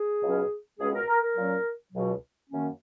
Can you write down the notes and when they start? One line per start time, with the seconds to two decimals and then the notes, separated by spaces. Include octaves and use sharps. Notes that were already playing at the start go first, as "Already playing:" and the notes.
Already playing: G#4
0.23 C#2 B2 F#3 C#4
0.79 C#2 B2 G#3 C#4 G#4
0.94 A#4
1.08 A#4
1.22 A#4
1.37 A#2 F#3 C#4
1.93 C#2 B2 F#3
2.50 F#2 D#3 A#3 C#4